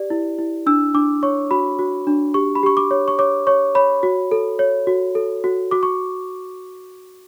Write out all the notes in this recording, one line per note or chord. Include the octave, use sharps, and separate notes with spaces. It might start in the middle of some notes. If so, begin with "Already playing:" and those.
Already playing: G4 D5
E4
E4
D4 E6
D4 D6
C#5 C#6
F#4 B5
F#4
D4
G4 C#6
B5
G4 C#6
D6
C#5
C#6
C#5 D6
C#5 C#6
C#5 B5
F#4
A4
C#5
F#4
A4
F#4
F#4 D6
C#6